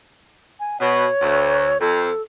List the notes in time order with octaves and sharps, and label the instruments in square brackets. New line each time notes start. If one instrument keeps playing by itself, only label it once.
[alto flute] G#5
[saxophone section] B2 [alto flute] C#5
[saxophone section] D2
[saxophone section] F2 [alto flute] A4